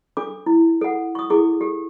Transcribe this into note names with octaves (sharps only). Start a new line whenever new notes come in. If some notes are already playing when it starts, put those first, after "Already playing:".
D4 A4 D6
E4
A4 F#5
C#6 D#6
E4 G#4 A4 D6
G4 A4